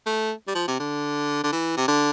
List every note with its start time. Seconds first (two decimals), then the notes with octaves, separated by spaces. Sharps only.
0.06 A3
0.48 G3
0.55 F3
0.68 C3
0.80 D3
1.43 D3
1.52 E3
1.77 C3
1.88 D3